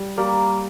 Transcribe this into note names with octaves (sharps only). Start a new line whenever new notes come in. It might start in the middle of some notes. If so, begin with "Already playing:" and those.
Already playing: G3
G3 A#3